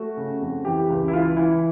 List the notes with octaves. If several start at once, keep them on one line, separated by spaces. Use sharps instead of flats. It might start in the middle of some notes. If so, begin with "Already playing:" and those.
Already playing: A3 F#4
C#3
F2
E3 G4
C#2
E4
E3 F4
E3 E4